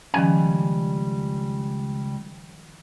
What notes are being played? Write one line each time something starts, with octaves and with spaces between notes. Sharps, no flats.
C#2 D#3 F3 G3 C#4 G#5